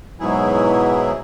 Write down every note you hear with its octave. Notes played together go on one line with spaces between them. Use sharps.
G#2 B2 F#3 E4 G#4